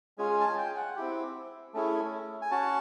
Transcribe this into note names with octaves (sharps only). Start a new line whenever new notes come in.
G#3 C#4 F4 G#4 G#5
A5
G#5
G5
F#5
C4 E4 G4
A3 C#4 E4 G#4
G#5
C#4 F#4 A5